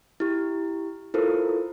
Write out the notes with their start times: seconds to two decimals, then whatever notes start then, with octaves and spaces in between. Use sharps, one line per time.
0.20 E4 G4
1.14 E4 F4 A4 A#4 C5